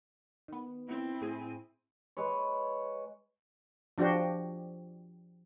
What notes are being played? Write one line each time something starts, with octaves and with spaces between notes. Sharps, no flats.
D#3 B3
C4 E4
A2 G#4 D#7
G#3 B4 C#5
F3 D4 F#4 G4 C5